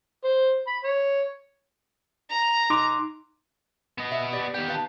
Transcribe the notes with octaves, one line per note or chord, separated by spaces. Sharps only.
C5
B5
C#5
A#5
D#4 C6 D6
B3 D#5
E5
G4 C5 D5
D#3 B3 G4
B4 F5 A5